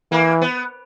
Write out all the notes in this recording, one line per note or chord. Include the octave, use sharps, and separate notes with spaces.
E3 A#3
B3